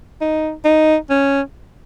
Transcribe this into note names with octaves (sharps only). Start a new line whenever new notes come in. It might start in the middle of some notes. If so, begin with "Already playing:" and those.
D#4
D#4
C#4